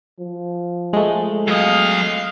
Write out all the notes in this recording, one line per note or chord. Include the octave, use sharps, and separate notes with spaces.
F3
G#3 A3
F#3 D#5 F5